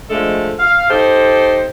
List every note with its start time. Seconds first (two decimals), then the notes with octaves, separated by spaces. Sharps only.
0.10 F3 G#3 A3 D4 A4 D#5
0.59 F5
0.90 D#4 G4 A4 C5